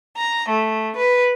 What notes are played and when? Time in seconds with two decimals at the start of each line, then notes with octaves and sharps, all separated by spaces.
0.16 A#5
0.48 A3
0.95 B4